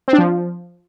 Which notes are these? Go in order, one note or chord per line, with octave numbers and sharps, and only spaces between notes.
C4
D4
F3